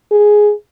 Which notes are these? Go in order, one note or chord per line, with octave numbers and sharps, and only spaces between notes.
G#4